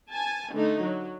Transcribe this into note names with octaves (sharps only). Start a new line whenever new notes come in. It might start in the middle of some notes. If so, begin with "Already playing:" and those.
G#5 A5
D3 A3 D#4
F#3